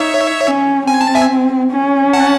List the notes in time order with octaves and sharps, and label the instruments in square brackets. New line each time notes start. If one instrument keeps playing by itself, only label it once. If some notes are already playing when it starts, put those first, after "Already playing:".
Already playing: [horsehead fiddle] D#4 [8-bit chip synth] C#5 E5
[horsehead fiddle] C#4
[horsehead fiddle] C4 [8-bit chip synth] G#5
[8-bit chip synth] A5
E5 G#5
[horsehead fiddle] C#4
[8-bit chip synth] F#5 A5